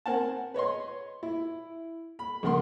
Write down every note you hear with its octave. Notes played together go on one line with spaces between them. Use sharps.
C4 A#4 F#5 G#5 A5
B4 C#5 D#5 C6
E4
B5
A#1 C#3 A#4 F#5 C6